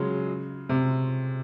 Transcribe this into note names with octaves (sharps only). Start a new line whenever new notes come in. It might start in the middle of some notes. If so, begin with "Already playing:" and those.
Already playing: C#3 F#3 G#3
C3